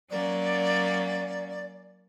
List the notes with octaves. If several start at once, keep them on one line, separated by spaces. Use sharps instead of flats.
F#3 A#3 C#4 D5